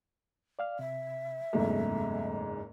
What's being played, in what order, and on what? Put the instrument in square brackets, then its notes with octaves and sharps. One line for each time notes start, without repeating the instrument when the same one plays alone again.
[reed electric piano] D5 F5 F6
[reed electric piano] C3 [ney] E5
[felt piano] F#1 E2 G#2 [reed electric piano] F#3 A3 A4